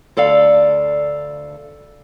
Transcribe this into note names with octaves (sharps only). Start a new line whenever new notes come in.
D2 A4 D5 F5